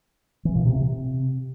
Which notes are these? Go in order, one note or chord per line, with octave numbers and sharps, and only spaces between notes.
E3
A#2
C3
C3